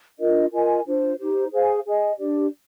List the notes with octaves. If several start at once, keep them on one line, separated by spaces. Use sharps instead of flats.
D4 F4 A#4 D#5
F4 A#4 D#5 G#5
D4 F4 C5
D#4 G4 C5
G#4 C5 F5 G#5
G#4 D#5 G#5
D4 G4 D5